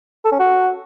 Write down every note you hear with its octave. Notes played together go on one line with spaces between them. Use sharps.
A4
C#4
F#4